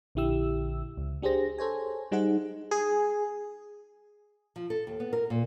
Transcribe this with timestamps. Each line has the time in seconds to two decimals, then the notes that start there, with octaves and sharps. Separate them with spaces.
0.15 A#1 D3 E4 G4 E6
0.97 C#2
1.22 D4 G4 G#4 C5 A#6
1.58 A4 C5 C#5 G#5
2.12 G3 D#4 G#4 C5 F#5
2.71 G#4
4.56 F3
4.70 A4
4.87 D#2
5.00 B3
5.13 A#4
5.30 A#2